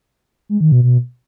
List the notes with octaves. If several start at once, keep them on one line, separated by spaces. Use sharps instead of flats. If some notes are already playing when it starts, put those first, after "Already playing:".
G#3
D#3
B2
B2